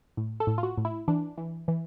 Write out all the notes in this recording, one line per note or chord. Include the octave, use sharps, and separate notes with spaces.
A2
A4
A2
F4
F#4
A2
E4
E3 D4
E3
E3